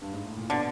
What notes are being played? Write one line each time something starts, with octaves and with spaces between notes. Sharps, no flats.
G2
G#2
A2
A#2
B2 D3